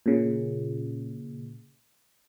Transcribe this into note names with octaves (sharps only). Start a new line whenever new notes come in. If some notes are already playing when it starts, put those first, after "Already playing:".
A#2 C#3